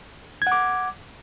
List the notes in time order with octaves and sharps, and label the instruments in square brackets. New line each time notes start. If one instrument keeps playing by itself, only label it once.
[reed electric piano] G#6
F#5
D6